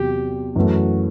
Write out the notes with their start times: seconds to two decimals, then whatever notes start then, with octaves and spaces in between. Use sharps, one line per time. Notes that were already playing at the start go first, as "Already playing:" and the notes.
Already playing: E2 C3 F#3 G4
0.55 F#2 E3 A3 F#4